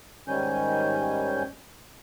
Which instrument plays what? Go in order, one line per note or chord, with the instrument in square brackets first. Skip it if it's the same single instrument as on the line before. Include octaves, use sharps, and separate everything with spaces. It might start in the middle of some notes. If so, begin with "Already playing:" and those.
[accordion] G#2 D#3 G3 C#4 G#5 G6